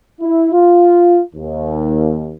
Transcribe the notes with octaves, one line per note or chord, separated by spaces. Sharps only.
E4
F4
D#2